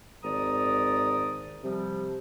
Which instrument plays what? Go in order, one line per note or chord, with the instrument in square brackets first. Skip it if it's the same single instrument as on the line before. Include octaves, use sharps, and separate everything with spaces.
[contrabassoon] G#1 [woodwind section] D5 A#5 D#6
[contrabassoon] C3 [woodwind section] F3 G3